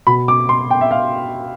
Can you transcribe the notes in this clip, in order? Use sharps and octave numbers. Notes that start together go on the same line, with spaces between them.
B2 B5
D6
C6
G5
E5
F5